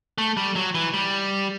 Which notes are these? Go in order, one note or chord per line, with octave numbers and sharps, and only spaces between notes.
A3
G3
F#3
E3
G3